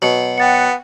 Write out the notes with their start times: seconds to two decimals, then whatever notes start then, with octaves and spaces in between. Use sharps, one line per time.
0.02 B2 F#3 C#7 F#7
0.38 B3 F#5 G5 A6 C#7